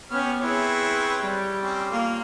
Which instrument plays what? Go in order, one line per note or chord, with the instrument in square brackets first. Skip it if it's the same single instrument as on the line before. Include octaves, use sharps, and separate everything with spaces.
[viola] B3 C#4 [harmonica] G4 C#5 F6
[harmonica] C4 B4 C#5 [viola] E4 G#4
[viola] G3
[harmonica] C4 C#4 D6
[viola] A#3 [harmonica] F4